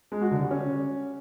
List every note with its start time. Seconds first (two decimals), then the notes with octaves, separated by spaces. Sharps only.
0.12 G#3
0.21 F#4
0.31 D3
0.41 G3
0.51 C#4